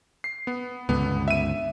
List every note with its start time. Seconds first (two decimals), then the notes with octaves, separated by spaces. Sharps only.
0.24 C7
0.47 B3
0.89 C#2 G2 D3 B3
1.28 E5 D#7